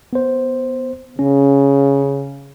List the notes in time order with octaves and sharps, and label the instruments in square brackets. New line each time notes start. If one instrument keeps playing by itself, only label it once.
[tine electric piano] B3 C5
[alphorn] C#3 [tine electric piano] C#4